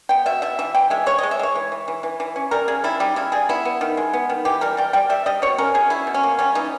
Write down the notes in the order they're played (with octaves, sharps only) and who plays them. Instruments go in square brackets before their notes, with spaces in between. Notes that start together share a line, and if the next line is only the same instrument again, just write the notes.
[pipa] B3 G5
B2 E5
B2 E5
E3 E5
E3 G5
G#3 E5
G#3 C#5
D#5
G#3
E5
G#3 C#5
E3
E3
E3
E3
E3
C#4
G3 A#4
C#3 G#4
G3 E4
G3 D#4
C#3 E4
G3 G#4
B3 E4
B3
D#3
G#3
B3
D#3
E3 G4
G3 A#4
G3 G5
G3 G5
G3 E5
G3 D#5
B2 C#5
C#4 A#4
B2 G#4
C#4 E4
B2
C#4
A#3
G3 C#4
E3 D#4